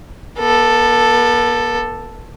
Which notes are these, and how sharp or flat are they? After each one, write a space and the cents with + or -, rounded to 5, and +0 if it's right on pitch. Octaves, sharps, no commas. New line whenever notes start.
B3 -45 A4 +0